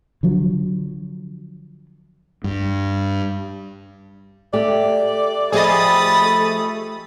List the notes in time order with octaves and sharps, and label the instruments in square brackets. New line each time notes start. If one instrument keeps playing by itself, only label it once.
[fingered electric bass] D3 F3 F#3
G2
[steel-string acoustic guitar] A3 G4 [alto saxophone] D5
[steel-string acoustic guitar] F3 G4 [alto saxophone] A3 [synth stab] G#4 D#5 [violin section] B5 D#6 A6